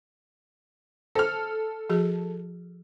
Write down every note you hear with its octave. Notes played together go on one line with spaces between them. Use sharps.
A4 C5 F6
F3 F#4 G#4